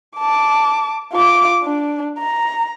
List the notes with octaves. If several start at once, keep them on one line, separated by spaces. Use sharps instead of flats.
A5 D6
F4 D6
D4
A#5